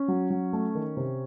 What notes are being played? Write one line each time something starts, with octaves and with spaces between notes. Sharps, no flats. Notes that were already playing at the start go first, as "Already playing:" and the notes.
Already playing: C#4
F#3
F#3
A3
D#3
C3